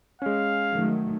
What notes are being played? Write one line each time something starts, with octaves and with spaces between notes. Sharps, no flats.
G#3 C#4 F5
D#3 F#3 A3